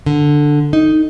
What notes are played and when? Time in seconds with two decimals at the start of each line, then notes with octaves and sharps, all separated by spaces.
0.06 D3
0.73 D#4